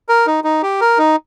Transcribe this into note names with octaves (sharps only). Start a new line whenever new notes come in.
A#4
D#4
D#4
G4
A#4
D#4